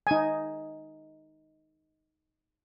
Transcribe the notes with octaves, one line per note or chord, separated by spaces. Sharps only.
D#4 G#5